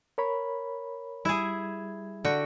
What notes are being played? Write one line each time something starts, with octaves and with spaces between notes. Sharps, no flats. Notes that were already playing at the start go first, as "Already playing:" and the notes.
A#4 C#5 B5
G3 E4 G#4 G#6
D3 F#4 G5